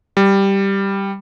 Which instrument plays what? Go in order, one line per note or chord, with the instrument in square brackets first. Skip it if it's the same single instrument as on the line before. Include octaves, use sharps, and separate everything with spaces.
[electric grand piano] G3